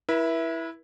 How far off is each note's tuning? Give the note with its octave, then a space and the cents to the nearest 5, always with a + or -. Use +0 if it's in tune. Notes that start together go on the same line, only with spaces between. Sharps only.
E4 +0 B4 -45 E5 +0